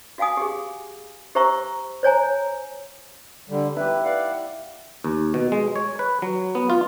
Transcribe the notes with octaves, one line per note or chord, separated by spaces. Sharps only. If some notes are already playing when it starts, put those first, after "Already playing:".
F#4 F5 F#5 G#5 D#6
G4 G#4
G4 C5 E5 A#5 C#6 E6
C5 C#5 G#5 A#5
D3 G3
E4 G4 B4
D5 F5 F#5
D#2
B2
G#3
C#5
B4
F#3
B3
F4